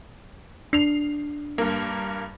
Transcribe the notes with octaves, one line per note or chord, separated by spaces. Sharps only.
D4 C7 F7
G2 A#3